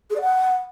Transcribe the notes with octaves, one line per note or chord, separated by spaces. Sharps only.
G#4
D5
F#5